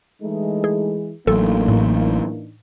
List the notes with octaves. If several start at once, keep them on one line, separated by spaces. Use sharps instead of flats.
E3 G#3 A3 D#4
G#4
A1 E3 F#3 A#3 D4 D#4 A4
A2